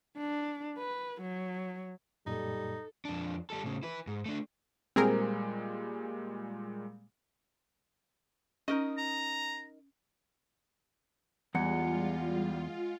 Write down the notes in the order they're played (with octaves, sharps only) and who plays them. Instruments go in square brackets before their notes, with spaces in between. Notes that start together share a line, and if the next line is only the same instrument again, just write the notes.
[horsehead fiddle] D4
B4
F#3
[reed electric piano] F#2 A#2 [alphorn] G3 [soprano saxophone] D#4 [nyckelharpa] A4
[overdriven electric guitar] F2 D4
G3 A4
A2 C#3
E4 B4
G#2
A3 D4
[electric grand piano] A#2 G3 G#3 [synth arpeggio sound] C4 G#4 A#4
[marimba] C#4 [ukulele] D#4 A#4 D#5
[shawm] A#5
[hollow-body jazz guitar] E2 [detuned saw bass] G3 [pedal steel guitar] G#3 F#5 [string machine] F4